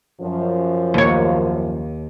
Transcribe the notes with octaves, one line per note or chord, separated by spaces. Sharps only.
F#2 F3
D#2 C#5